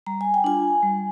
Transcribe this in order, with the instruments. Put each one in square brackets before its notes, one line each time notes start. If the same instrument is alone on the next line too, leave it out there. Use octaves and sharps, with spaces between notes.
[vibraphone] G3 A#5
G#5
G5
D4 F4 G#5
G3